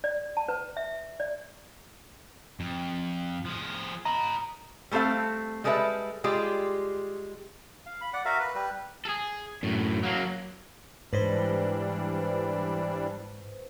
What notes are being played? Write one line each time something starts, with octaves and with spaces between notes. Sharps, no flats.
D5
A5
B4
E5
D5
F2
F3 G#4
D#5 A#5 B5
G3 A3 C4 A4 F5
G3 G#3 A4 B4 D#5 E5
G3 G#3 F4 G4
F5
B5
D5 F#5
F#4 A#4 E5 F5
B4
G3 B4
G#4 A4
F#2 A2
F#3 A#3
G#2 E3 G3 D4 B4 C5